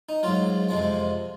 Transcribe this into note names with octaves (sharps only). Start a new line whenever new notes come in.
D#4
G#2 F#3 F4
F2 C3 F3 G#3